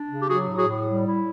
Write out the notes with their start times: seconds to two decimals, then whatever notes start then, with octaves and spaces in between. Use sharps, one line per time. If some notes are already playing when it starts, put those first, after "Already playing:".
Already playing: D4
0.08 C#3
0.21 G4
0.28 F#3 F#4 G#4
0.48 A2
0.57 F#4 G#4
0.67 A2
0.86 G3
1.06 E4